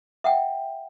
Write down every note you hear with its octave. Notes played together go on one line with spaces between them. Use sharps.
E5 F#5 G5